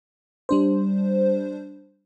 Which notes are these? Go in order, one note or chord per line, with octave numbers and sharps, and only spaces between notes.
G3 D4 C5